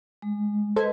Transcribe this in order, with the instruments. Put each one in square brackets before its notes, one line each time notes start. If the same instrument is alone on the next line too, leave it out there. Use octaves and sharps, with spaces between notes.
[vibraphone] G#3
[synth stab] A4 C5 G#6 [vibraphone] B4 D#5